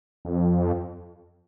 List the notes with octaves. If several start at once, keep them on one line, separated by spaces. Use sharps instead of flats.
F2